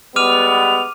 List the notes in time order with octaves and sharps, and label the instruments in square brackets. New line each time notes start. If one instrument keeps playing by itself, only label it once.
[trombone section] G3 G#3 B3 [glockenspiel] D6 F6 D#7 [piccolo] F7